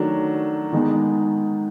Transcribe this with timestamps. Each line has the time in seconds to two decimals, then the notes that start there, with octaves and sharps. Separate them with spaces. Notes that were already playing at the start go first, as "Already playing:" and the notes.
Already playing: D#3 F#3 A3 D4 F#4
0.73 D#3 G#3 B3 D#4